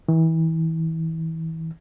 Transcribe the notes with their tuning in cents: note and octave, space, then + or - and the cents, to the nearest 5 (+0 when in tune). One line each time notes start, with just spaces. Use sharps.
E3 -30